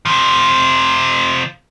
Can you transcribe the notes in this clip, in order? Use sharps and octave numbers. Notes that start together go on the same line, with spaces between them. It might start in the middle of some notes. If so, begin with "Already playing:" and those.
C3 F3